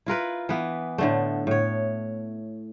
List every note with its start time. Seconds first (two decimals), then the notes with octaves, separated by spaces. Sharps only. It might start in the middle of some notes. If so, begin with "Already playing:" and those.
0.06 E4 F4 A#4 B4
0.49 E3 B3
0.98 A2 D3 A3
1.47 A2 C#5